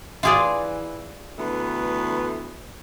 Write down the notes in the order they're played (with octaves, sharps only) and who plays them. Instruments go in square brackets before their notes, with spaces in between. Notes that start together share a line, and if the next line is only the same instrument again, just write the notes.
[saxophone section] E3 [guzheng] F4 G#4 D5
[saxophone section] D2 E3 B3